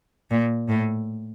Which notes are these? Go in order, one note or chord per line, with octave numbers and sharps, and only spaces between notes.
A#2
A2